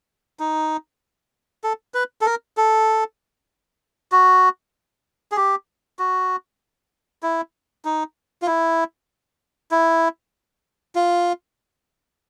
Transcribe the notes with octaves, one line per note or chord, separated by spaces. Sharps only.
D#4
A4
B4
A4
A#4
A4
F#4
G#4
G4
F#4
E4
D#4
F4
E4
E4
F4